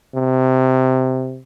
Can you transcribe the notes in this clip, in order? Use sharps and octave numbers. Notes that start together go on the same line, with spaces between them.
C3